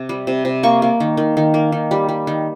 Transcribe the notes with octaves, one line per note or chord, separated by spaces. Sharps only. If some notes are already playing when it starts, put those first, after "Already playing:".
Already playing: C3
G3
C3
C3
A#3 C#6
A#3
D#3
D#3
D#3
A#3
D#3
G3
G3
D#3